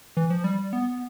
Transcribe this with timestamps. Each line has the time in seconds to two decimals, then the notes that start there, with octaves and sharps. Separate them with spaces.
0.17 E3
0.30 F3
0.44 G3
0.73 B3